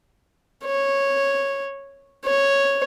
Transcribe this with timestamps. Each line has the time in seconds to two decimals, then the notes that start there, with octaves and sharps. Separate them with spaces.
0.66 C#5
2.25 C#5